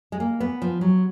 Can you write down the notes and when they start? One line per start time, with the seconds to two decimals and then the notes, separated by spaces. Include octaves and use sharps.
0.12 G#3
0.20 A#3
0.40 B3
0.62 F3
0.81 F#3